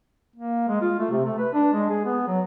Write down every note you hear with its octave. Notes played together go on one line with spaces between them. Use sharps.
A#3
G#3
F4
A3
C3
A3
B4
D4
G#3
G#4
B3
F#3